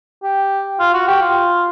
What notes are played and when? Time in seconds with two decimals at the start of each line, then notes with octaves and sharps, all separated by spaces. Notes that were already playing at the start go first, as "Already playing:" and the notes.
0.23 G4
0.80 F4
0.93 F#4
1.07 G4
1.21 F4